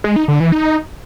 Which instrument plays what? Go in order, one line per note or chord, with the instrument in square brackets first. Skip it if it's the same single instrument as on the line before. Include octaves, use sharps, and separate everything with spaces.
[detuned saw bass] G#3
D#4
D3
E3
D#4